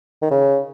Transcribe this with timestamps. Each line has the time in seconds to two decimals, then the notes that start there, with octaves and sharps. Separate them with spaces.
0.22 D#3
0.31 C#3